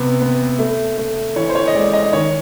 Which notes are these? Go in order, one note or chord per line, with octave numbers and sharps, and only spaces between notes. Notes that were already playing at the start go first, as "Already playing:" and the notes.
Already playing: C3 B3
B3
A3
A3
E3 C#5
C5
C#5
D#5
G#3 D5
D#5
D#3 C#5